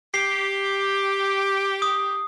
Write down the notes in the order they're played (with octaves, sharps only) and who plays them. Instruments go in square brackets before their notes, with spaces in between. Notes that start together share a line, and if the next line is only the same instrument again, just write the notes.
[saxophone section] G4 [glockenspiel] C7
[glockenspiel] D#6